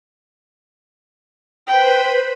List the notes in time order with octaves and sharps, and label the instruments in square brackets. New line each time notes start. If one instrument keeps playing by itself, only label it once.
[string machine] B4 C5 B5 [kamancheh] G5